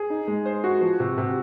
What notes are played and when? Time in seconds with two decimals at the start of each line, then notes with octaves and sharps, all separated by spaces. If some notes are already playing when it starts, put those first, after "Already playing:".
Already playing: G#4
0.10 D#4
0.28 G#3
0.46 C5
0.64 F#4
0.81 F3
1.00 C3
1.18 C3